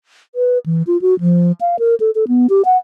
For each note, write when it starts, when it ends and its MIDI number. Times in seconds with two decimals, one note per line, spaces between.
0.35 0.58 71
0.66 0.83 52
0.87 1.00 65
1.01 1.18 66
1.20 1.52 53
1.61 1.76 77
1.79 1.95 70
2.00 2.11 69
2.15 2.24 69
2.28 2.47 59
2.50 2.62 67
2.65 2.77 78